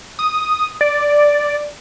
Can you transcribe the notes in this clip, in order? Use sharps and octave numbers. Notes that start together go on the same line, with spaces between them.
D#6
D5